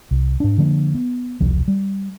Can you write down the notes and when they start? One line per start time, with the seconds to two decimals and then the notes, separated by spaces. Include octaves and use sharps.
0.11 C2
0.40 G#2 D4
0.58 D3 F3 A#3 D4
0.95 B3
1.40 E1 C2 F3
1.68 G3